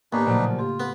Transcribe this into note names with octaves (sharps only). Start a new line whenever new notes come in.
D#2 A2 B3 D4 D#4 G4 B4 G#5
A#2 C#3 F3 F#3 A3 A#3
F4 G4
B3 B4